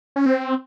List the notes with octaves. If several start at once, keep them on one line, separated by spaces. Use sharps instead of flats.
C#4
C4